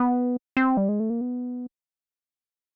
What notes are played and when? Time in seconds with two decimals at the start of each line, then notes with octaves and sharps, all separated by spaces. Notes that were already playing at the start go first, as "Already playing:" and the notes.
Already playing: B3
0.57 C4
0.77 G3
0.89 G#3
1.00 A3
1.10 A#3
1.21 B3